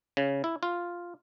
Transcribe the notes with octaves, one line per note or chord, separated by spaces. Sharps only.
C#3
E4
F4